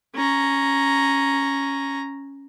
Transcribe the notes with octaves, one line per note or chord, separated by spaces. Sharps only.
C#4 A#5